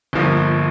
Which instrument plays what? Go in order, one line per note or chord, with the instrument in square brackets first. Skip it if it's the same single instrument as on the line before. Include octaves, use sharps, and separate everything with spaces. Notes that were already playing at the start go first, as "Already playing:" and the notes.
[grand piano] G1 G2 F3 A#3